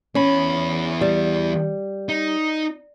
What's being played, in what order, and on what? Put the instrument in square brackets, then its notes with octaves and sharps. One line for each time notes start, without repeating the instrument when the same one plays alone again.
[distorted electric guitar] E2 B5 [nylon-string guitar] C#4
[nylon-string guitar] G3
[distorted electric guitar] D#4